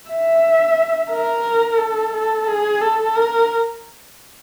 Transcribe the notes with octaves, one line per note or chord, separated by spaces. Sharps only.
E5
A#4
A4
A4
G#4
A4
A#4